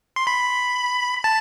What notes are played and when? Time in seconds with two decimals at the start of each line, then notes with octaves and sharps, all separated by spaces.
0.16 C6
0.27 B5
1.24 A5